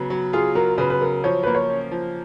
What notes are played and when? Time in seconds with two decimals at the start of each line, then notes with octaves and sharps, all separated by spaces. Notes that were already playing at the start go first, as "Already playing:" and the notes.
Already playing: C#3 F#3 B3
0.10 F#3
0.33 F4 G#4
0.55 F#3 A#4
0.78 C#3 B4
0.90 B4
1.01 F#3 A#4
1.24 F3 C#5
1.43 A#3 B4
1.55 C#5
1.70 C#4
1.91 F3